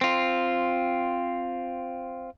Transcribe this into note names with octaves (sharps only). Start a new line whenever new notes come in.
C4 F4